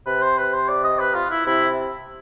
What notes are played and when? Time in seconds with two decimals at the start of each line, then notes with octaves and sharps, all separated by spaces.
0.06 C3 B4
0.22 C5
0.38 B4
0.53 C5
0.69 D5
0.84 D#5
0.99 B4
1.15 F4
1.30 E4
1.46 C3 E4